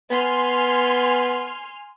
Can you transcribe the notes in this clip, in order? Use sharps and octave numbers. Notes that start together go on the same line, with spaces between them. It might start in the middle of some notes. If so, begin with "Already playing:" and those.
B3 G#5 C6 F6